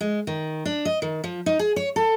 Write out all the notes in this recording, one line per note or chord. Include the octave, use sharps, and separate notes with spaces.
G#3
D#3
D4
D#5
D#3
F3
D#4
G#4
C#5
A4